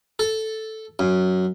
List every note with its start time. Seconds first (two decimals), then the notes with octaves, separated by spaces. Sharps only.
0.19 A4
0.99 F#2